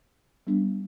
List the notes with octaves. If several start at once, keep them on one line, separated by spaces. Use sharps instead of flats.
G3 B3 D4